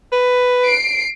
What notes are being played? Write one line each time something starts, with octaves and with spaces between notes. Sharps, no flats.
B4
C7 D7